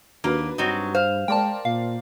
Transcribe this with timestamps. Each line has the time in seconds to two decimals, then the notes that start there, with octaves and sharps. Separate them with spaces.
0.24 D#2 A#3 D4 F#4 B4
0.58 G2 F#3 C4 D#4
0.95 C5 F5
1.28 G#3 A#4 C5 D5 G5 A5
1.65 A#2 F5